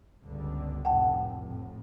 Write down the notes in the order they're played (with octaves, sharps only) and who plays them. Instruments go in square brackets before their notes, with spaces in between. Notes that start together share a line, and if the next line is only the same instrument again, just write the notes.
[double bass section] G1 C#2 D3
[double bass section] F1 A2 [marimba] F#5 G5 A5
[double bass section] F2 A2